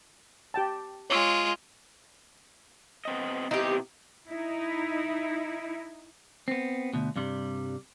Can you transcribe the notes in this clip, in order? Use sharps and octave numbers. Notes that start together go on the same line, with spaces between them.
G4 G5 A5
G#3 F4 C#5 D6 E6
B3 C4 D#5
B2 C4 D#4 E4 G4
D#4 E4
B3 C4
D2 B2
G2 C3 G3